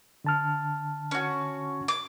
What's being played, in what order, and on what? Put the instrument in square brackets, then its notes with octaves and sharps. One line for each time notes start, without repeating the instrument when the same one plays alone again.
[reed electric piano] D3 A5 F6
[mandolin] C#4 F#4
D6